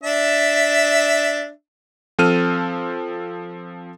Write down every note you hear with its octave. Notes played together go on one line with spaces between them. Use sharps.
D4 E5
F3 C4 A4 F6 D#7